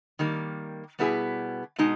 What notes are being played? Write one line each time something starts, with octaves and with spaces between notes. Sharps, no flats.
D#3 G3 A#3
B2 G3 B3 E4 G#4
B2 G#3 D#4